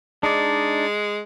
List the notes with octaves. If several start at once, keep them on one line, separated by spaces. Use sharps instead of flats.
G#3 D4 D#4 D5